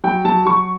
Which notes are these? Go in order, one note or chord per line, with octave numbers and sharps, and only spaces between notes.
F#3 G5
F#3 A5
F#3 C#6